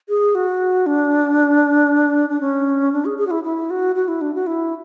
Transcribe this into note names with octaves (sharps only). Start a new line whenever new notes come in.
G#4
F#4
D4
D4
C#4
D4
G#4
G#4
F#4
E4
E4
F#4
F#4
E4
D4
F#4
E4